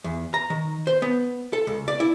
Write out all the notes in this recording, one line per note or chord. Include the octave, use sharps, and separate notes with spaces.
E2
A#5
D#3
C5
B3
A4
C#2
D5
E4